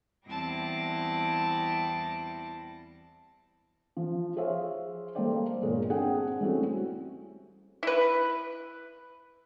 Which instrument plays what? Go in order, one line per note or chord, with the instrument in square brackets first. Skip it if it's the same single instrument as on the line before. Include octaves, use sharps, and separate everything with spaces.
[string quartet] E2 G3 C4 E4 A5 A#6
[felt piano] F3
G#4 C5 C#5 E5 F5
G3 A#3 A4 C5 D5 G5
G1 A#2 G#3 A#4 C#5
C4 D4 G#4 F#5 G5
G3 A3 C4 C#4 E4 F#4
[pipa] E4 B4